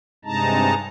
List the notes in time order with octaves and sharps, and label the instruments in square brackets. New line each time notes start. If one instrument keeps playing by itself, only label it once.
[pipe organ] G2 C3 G#3 D#4 A5 A#5